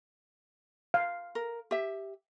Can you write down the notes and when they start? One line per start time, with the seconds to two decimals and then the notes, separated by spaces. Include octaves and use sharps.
0.94 F5
1.35 A#4
1.71 G4 E5